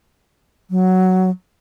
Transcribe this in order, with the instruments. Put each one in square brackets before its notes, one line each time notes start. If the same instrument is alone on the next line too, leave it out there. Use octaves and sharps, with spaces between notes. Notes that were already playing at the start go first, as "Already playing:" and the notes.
[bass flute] F#3